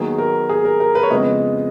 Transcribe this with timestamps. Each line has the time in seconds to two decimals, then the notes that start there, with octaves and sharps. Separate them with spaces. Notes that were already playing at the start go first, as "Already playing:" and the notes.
Already playing: D#2 D#3 F#3 B3 G#4
0.18 A#4
0.49 G#4
0.65 A#4
0.80 A#4
0.95 B4
1.03 C#5
1.11 F2 C#3 G#3 B3 D#5